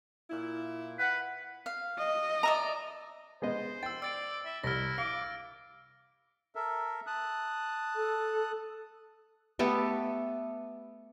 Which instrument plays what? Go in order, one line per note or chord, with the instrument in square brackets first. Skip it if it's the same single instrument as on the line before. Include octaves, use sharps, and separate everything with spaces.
[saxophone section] A#2 E4
[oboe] B4 [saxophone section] F#5
[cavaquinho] F5
[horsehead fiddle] D#5
[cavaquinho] D5 E5 A#5
[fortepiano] G#3 B3 D#5 [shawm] C5
[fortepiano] G5 [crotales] E6 A6
[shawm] D5 [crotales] E6 A6 D7
[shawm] E5
[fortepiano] C2 [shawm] E4 [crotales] F6 A#6
[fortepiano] F5 [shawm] D6 [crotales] F6
[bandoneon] A4 A#4 E5
A5 D#6 F#6
[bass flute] A4
[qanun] A3 B3 G4 A4